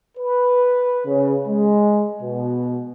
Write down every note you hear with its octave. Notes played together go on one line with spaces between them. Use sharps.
B4
C#3
G#3
B2